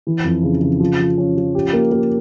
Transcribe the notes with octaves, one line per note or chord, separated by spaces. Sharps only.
E3
F2
C#3
C#3
F3
F3
C#4
F3
G4
A#3
A#3